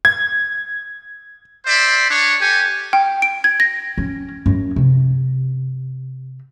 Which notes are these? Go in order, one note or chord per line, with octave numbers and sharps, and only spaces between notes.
G#6
C5 D5 E5
D4 C#5
G4 A4 G#5
G5
D7
G#6
A#6
C#4
F#2
C3